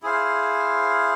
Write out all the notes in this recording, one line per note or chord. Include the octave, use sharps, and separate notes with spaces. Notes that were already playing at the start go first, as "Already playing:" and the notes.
E4 G#4 C5 F5